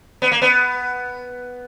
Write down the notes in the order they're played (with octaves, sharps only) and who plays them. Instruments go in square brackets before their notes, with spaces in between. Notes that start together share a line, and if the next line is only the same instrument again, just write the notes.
[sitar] B3
A#3
B3